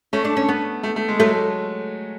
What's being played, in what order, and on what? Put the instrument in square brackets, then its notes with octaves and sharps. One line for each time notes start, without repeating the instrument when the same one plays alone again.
[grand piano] A3 [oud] C#4
[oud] D4
C#4
B3
[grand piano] A3
A3
G#3
[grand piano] F#3 [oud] A3